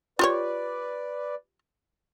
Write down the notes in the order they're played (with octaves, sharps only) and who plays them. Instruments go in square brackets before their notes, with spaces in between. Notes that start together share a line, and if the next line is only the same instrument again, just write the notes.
[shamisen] F4 G4 C#5 [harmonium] B4 D5